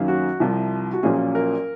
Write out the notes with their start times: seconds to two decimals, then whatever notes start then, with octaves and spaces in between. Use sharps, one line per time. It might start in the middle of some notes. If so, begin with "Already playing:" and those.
Already playing: F#2 D#3 A#3 C#4
0.08 F#4
0.40 C2 C3 F3
0.93 F#4
1.03 A#1 A#2 F#3 A#3 C#4 G#4
1.35 A#4